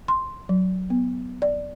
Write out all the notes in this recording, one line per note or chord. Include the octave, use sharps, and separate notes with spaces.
C6
F#3
B3
D5